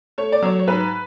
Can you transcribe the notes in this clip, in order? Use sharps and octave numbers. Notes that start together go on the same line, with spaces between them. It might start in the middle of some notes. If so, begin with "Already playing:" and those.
A3 C#5
D5
F#3 C#5
C#5
G#2 B4